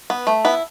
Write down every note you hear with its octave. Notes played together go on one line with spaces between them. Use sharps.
B3
A3
B3 E4